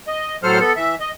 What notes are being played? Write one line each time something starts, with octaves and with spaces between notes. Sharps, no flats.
D#5
A2 F#3 A4 C5 F6
B3 A4
E3 E5
D#5